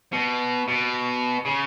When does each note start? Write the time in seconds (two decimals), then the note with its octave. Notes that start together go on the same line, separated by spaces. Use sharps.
0.13 B2
0.68 B2
1.45 C#3